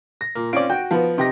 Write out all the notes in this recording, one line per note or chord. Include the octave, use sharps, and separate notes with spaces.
A#6
A#2 A#3
C4 C#4 F4 D5 D7
F#4 G5
F3 B3
C3 D#4 G4 A#6